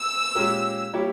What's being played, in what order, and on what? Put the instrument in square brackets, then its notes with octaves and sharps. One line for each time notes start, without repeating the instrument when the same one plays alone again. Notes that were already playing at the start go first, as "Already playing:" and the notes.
Already playing: [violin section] E6
[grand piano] A#2 G#3 C#4 G4 A#4
G3 A#3 E4 G4 C#5